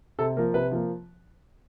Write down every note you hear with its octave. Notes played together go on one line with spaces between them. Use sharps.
C3 A4
F3 A#3 A#4
C3 B4
F3 A#3